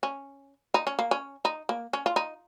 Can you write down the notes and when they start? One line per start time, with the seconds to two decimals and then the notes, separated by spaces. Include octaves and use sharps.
0.03 C#4
0.74 D#4
0.87 C#4
0.99 A#3
1.11 C#4
1.45 D#4
1.69 A#3
1.93 C#4
2.06 F4
2.16 D#4